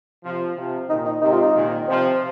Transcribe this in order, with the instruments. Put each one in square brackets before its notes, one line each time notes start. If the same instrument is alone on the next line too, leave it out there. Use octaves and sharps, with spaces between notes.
[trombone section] C3 F3
C3 F3
[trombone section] A#2 D#3 [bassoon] D#4
[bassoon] D#4
[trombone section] G#2 C3 [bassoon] D#4
[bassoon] F4
D#4
[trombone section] A#2 D#3
[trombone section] C3 F3 [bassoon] C4